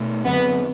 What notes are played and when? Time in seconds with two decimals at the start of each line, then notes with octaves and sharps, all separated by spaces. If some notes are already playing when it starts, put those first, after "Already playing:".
Already playing: B2 A3
0.25 F#2 D3 F#3 B3 C4